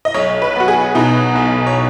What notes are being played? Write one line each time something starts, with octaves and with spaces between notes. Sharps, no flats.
D#5
B1 C#5
B4
B3 F#4
G#4
B2 D#4
B1
C#5